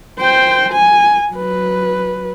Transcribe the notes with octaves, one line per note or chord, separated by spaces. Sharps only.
C5 G5
G#5
F#3 B4